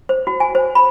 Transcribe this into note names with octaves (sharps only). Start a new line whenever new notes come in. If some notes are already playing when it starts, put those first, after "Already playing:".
C5
F#4
G#5
C5
B5